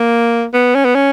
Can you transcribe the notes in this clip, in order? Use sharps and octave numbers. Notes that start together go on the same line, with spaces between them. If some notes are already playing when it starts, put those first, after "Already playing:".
Already playing: A#3
B3
C#4
B3
C#4